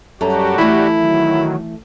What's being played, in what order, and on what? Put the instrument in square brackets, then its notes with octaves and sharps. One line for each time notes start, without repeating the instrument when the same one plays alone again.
[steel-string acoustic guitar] F#2 A4 A#5 [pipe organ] G3 F#4 G4
[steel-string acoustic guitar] E3 A3 [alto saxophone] E4
[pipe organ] D#3 F#3